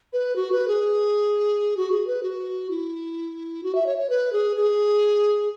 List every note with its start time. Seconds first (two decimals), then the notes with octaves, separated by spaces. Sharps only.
0.13 B4
0.36 F#4
0.52 B4
0.68 G#4
1.77 F#4
1.91 G#4
2.07 B4
2.23 F#4
2.70 E4
3.63 F#4
3.75 E5
3.86 C#5
3.98 C#5
4.09 B4
4.33 G#4
4.56 G#4